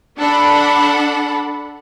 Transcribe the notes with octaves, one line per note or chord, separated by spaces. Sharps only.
D4 A4 F#5 B5